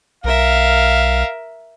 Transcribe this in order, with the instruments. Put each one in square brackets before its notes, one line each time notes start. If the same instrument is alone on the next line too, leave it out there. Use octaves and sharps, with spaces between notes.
[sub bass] B1 [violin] A#4 E5 [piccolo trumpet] F5